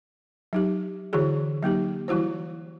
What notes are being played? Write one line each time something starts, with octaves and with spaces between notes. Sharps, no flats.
F#3 D#4 G4
D3 E3 E4 F#4 G#4
F#3 A#3 D#4 G4
E3 G3 E4 F#4 C5